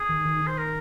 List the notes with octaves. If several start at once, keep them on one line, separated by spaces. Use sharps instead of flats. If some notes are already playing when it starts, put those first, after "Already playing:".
Already playing: G#4
D#3
D#3
D#3
C5
A#4